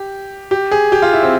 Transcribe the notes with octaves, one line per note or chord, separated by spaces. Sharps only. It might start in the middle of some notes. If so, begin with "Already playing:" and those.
Already playing: G4
G4
G#4
G4
F4
E4
C4